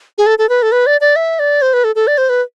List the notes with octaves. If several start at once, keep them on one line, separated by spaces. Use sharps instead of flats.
G#4
A4
A4
B4
A4
B4
D5
D5
E5
D5
C5
B4
A4
A4
D5
C5
B4